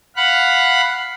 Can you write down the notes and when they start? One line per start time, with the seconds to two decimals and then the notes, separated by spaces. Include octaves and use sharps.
0.16 F5 F#5 B5 F#6